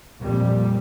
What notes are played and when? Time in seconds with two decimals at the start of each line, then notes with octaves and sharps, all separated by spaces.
0.19 F2 A#2 G3